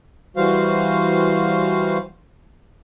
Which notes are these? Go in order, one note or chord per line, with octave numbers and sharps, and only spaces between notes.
E3 G3 F#4 C5 F5